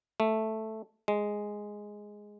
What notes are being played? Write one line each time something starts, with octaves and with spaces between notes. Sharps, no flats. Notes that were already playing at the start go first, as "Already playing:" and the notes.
A3
G#3